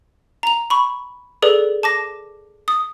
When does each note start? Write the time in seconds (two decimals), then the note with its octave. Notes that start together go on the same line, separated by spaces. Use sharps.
0.43 A#5 F7
0.70 B5 C#6
1.42 G#4 A4 B4 D5
1.83 A5 D6 A#6
2.68 D#6